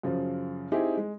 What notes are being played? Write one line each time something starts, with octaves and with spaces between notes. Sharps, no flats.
F#2 C#3 F3
C4 D#4 E4 G4 G#4
G#3